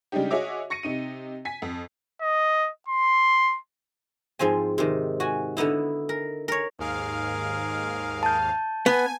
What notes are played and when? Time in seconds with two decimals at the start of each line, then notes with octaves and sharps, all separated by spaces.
0.12 C#3 G3 G#3 D4 D#4 G4
0.31 F#4 G#4 C#5 D#5 E5 D6
0.70 C#6 A#6 C#7 D#7
0.83 C3 D#4 D#7
1.45 G#5 B6
1.62 F2
2.22 D#5
2.88 C6
4.39 G#2 F3 C4 G#5
4.78 C3 D#3
5.20 F#4 G#5
5.57 D3 B3 D#4 E4
6.09 A#4
6.48 A#4 C#5
6.79 D#2 G#2 G#4 A#4 F5
8.23 A5 G6
8.86 B3 G#5